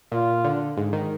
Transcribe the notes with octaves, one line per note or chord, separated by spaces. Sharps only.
A#2 F4
D3
G#2
D#3